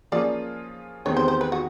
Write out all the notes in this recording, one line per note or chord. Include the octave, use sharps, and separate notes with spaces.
F3 A#3 C#4 F4 G#4 D5
E2 C3 D#3 G#3 B3 C#5
C5
C5
B4
F#4